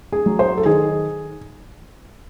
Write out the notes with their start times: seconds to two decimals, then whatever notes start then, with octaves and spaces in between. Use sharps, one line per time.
0.12 G#4
0.26 F#3
0.39 C5
0.57 A4
0.65 D#3 G#4